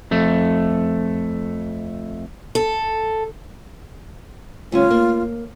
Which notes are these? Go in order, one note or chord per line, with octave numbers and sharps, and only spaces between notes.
F2 A3
A4
D2 G3 C#4 F4
A#3